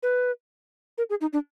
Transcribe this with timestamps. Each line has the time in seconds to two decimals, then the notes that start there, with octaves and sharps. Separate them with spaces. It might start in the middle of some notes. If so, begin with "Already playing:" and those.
0.03 B4
0.98 A#4
1.10 G#4
1.21 D#4
1.33 D4